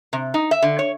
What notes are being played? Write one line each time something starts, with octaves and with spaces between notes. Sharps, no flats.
C3
D#4
E5
D3
C#5